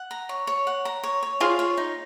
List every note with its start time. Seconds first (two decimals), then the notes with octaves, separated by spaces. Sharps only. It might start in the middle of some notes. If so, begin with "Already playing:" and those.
Already playing: F#5
0.11 A#5
0.29 C#5
0.47 C#5
0.67 F#5
0.85 A#5
1.03 C#5
1.23 C#5
1.40 F4 G#4
1.59 C#5
1.77 D#4